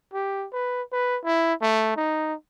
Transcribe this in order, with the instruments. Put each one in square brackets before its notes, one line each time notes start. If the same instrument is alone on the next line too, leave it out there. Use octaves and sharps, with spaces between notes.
[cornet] G4
B4
B4
E4
A3
D#4